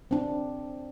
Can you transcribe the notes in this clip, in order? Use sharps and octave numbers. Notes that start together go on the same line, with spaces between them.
C4 D4